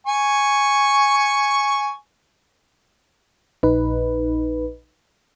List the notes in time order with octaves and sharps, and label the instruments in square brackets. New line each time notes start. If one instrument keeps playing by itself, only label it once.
[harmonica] G#5 C#6
[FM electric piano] A#1 D#4 B4